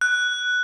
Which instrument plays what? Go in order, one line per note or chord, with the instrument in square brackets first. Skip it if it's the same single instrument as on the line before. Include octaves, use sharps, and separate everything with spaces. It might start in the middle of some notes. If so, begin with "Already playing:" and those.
[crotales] F#6